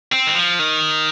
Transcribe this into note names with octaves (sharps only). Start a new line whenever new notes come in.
C4
D#3
F3
D#3